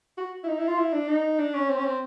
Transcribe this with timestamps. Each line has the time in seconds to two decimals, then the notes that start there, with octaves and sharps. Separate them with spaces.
0.18 F#4
0.44 E4
0.48 D#4
0.59 E4
0.68 F4
0.78 E4
0.93 D4
1.08 D#4
1.39 D4
1.54 C#4
1.70 C4
1.78 C#4
1.85 C4